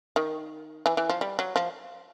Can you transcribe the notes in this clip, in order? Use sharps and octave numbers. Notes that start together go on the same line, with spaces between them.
D#3
E3
E3
F3
G3
F#3
F3